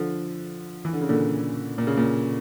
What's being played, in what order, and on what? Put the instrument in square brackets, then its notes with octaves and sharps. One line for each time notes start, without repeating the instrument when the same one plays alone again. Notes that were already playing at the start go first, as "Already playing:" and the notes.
Already playing: [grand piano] D3 F3
E3
D3
C#3
A#2 D3
A#2
C#3
A#2